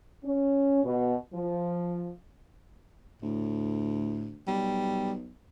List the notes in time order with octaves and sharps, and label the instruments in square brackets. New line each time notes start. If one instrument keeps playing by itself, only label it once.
[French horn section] C#4
B2
F3
[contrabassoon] D2 [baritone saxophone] A2
[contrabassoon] B1 [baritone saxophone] G3